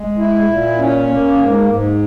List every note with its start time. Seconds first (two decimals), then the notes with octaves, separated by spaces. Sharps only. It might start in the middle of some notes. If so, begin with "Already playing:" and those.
Already playing: G#3
0.18 E4
0.48 A#2
0.78 C#4
1.08 A#3
1.38 G#2
1.67 G#2